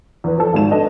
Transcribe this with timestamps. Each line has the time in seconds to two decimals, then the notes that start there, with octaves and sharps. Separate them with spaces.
0.24 E2 B4
0.38 F3 A4
0.53 G#1 G#3 D#4 E7
0.71 D4 A4 B4 D#5